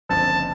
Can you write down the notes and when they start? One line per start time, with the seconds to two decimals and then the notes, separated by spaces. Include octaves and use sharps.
0.10 F#1 F2 D3 F3 A5